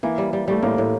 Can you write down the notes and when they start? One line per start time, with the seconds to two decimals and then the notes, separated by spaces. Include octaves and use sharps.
0.03 E3 A#3
0.18 G3
0.33 G3
0.48 G3 A3
0.63 A2 A#3
0.78 A2